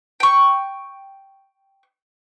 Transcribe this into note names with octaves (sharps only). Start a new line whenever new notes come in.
G5 C#6